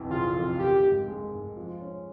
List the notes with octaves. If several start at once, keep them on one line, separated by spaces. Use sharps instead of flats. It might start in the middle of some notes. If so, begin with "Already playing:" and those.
Already playing: B1 F2 E3
C#3 F4
F1
D#3 G4
G#2
G#3
G#2
F3
C#4